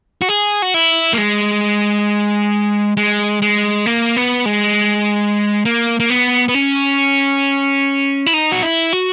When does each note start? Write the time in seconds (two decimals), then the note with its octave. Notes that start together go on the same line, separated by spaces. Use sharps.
0.22 F#4
0.29 G#4
0.62 F#4
0.74 E4
1.13 A#3
1.18 G#3
2.97 G#3
3.42 G#3
3.86 A#3
4.17 B3
4.46 G#3
5.65 A#3
6.00 A#3
6.10 B3
6.48 B3
6.55 C#4
8.26 E4
8.34 D#4
8.52 F#4
8.63 E4
8.93 F#4